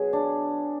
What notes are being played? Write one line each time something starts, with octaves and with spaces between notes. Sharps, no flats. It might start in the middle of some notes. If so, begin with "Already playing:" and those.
Already playing: B2 F#3 G#4
D4